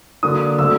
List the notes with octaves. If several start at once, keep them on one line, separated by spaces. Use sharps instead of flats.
D3 F#3 A#3 D4 D#6
D3 F#3 A3 C4 E6